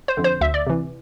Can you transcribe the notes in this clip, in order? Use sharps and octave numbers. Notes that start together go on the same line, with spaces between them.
C5
F2 D3
C5
D2 E5
D5
C3 E3